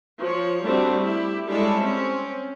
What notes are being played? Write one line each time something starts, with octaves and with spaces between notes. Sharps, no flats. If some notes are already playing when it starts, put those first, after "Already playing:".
F3 C#5
G3 A3 C4 D4 F#4
E4 G4
G3 G#3 D4 E4 A4 C#5
C4 C#4